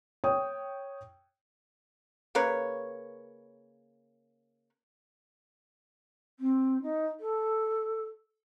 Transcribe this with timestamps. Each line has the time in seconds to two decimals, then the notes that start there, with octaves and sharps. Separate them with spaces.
0.24 C#5 G5 D#6
2.35 C#3 A#3 B4 C#5
6.39 C4
6.82 D#4
7.19 A4